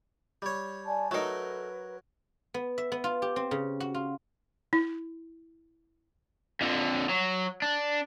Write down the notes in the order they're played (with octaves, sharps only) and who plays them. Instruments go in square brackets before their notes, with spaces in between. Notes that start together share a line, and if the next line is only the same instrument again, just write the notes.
[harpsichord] G3 C#5
[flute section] D5 G#5 A5
[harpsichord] F#3 A#4 [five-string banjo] A3 D#4 [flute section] B4
[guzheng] B3
E5
B3
F4
G4
C4
C#3
F#4
F4
[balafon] E4
[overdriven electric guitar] F2 D3
F#3
D4